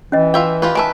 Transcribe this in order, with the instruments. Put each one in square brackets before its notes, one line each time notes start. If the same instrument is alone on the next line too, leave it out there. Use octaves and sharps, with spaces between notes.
[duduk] E3 [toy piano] C#4 D#5
[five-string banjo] F4 E5 G5
F4 G4 B4
[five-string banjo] D#3 B4 E5 [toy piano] G#5 A5